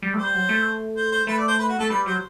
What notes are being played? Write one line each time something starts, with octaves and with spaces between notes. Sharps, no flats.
G3
A3
G3 C5
F#3
A3
C5
C5
A3 B4
D5
C5
B4
F#4
A3 A4
G3 B4
F#3 C5